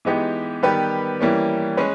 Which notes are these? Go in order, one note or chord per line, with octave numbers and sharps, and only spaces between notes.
E3 G#3 B3 D#4 G4
D#3 G3 B3 G4 B4
E3 G3 A#3 C#4
G#3 C#4 G#4 B4